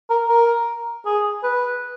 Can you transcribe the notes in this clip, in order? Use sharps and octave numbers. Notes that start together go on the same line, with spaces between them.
A#4
A#4
G#4
B4